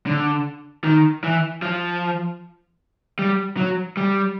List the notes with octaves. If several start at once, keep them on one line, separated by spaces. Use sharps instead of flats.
D3
D#3
E3
F3
G3
F#3
G3